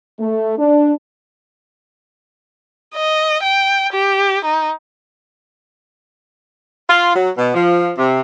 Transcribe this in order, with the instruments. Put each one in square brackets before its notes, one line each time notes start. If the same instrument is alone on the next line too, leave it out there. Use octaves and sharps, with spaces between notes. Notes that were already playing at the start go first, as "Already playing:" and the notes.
[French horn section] A3
D4
[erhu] D#5
G5
G4
D#4
[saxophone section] F4
F#3
B2
F3
C3